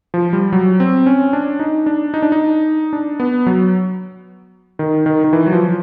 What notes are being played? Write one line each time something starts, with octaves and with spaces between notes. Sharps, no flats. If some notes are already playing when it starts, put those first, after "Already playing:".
F3
G3
F#3
C4
C#4
D4
D#4
D4
D#4
D4
D#4
D4
B3
F#3
D#3
D#3
D#3
E3
F#3
F3